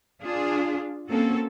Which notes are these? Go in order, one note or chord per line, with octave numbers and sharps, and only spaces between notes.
D4 F4 G#4
A#3 C4 C#4 F#4 A4